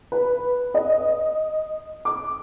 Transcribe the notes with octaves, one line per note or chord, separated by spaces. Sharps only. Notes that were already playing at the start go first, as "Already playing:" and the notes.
B4
D#5
D6